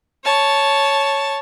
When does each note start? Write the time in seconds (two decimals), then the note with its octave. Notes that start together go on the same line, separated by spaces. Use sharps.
0.25 C#5 A5